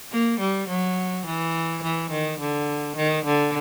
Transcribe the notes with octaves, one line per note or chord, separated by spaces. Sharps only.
A#3
G3
F#3
E3
E3
D#3
D3
D#3
D3